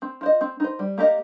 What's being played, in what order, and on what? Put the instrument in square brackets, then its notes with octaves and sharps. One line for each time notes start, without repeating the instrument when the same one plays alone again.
[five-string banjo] C4
F4 C5 D#5
C4
D#4 C5
G3
A#3 G4 A#4 D#5